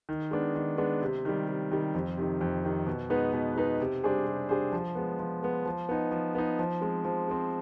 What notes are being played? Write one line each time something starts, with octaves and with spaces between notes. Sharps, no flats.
D#3
G#3 B3 D4
D#3
G#3 B3 D4
C3
D#3 G3
C3
D#3 G3
F2
C3 D#3
F2
C3 D#3
B2
G#3 B3 D#4 B4
B2
G#3 B3 D#4 B4
C3
G3 D4 G#4 C5
C3
G3 D4 G#4 C5
F3
G#3 B3
F3
G#3 B3
F3
B3 D#4
F3
B3 D#4
F3
G#3 C4
F3
G#3 C4